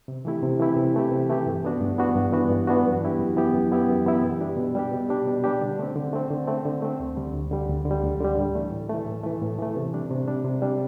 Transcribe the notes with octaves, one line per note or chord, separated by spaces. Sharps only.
C3
E3 A3 E4 G4
C3
E3 A3 E4 G4
C3
E3 A3 E4 G4
C3
E3 A3 E4 G4
G2
E3 B3 D4 F#4
G2
E3 B3 D4 F#4
G2
E3 B3 D4 F#4
G2
E3 B3 D4 F#4
F#2
E3 B3 E4 G4
F#2
E3 B3 E4 G4
F#2
E3 B3 E4 G4
F#2
E3 B3 E4 G4
B2
G3 D4 G4
B2
G3 D4 G4
B2
G3 D4 G4
B2
G3 D4 G4
D3
A3 C4
D3
A3 C4
D3
A3 C4
D3
A3 C4
D2
D3 G3
D2
D3 G3
D2
D3
G3
D2
D3 G3
A2
E3 A3
A2
E3 A3
A2
E3 A3
A2
E3 A3
C3
G3 D4
C3
G3 D4
C3
G3 D4